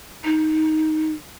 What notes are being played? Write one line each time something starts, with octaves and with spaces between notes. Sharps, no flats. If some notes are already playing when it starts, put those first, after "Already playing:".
D#4